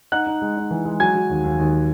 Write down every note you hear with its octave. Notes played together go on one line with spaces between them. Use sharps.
D#4 F#5 F#6
D#4
G#3
D#4
E3
G#3
F#3 G#5 G#6
F#3
D#2
D#2
D#2